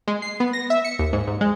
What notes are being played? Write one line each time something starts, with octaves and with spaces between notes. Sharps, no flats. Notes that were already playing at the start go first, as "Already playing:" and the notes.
G#3
C7
B3
A#6
E5
C#7
D#2
G#2
G#2
G#3